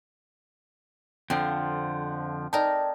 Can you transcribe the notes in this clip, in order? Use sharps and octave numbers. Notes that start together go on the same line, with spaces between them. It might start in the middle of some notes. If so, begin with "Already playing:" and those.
F2 D3 F3 C4
D#4 A#4 D5 G5 A5